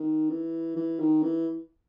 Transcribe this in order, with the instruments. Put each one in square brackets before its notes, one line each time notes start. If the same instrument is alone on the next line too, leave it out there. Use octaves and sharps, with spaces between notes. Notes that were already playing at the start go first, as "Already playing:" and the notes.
Already playing: [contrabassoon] D#3
E3
E3
D#3
E3